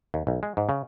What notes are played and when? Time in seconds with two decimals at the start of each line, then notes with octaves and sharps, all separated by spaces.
0.14 D#2
0.27 B1
0.43 G#3
0.57 G#2
0.69 C#3